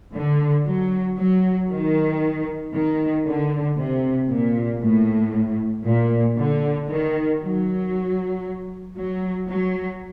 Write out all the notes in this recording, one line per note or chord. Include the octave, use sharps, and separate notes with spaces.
D3
F#3
F#3
D#3
D#3
D3
C3
A#2
A2
A#2
D3
D#3
F#3
F#3
F#3